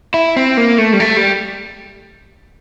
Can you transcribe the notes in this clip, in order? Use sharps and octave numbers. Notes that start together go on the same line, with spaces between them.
E4
C4
A#3
A3
G3
A3
G3